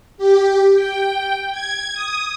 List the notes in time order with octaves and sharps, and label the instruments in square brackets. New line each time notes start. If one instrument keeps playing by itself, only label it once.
[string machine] G4
G5
G#6
D#6